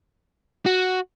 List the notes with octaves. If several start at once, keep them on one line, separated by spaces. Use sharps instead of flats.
F#4